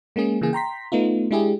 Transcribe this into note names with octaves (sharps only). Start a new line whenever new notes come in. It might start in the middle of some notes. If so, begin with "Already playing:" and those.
G#3 A#3 C#4 G#4
C#3 E3 A#3 G#4
G5 A#5 C6 B6
A3 B3 D#4 F4
G#3 D4 E4 G4 G#4